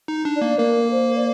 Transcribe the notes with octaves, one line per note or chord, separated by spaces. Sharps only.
D#4
D4
D5
A#3
A#3 A#4
C5
D5